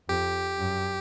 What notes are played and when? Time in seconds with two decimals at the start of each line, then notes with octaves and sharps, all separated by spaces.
0.09 F2 G4
0.59 F#2